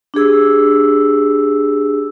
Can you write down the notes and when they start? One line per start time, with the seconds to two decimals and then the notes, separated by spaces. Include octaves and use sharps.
0.14 D4 G4 G#4 E6